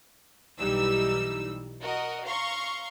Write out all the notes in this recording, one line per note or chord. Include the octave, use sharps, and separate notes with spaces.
B1 E3 G3 D#4 E6
F#4 A#4 D#5
F5 A#5 C6 C#6